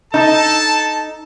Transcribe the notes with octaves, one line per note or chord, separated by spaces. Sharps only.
D#4 A4 A5